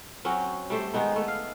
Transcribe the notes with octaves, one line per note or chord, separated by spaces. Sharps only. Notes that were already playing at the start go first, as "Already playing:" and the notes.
F#3 C4 C#4 F#4
G3 A3 C5
D#3 G#3 B3 D#4
A3 B3
F5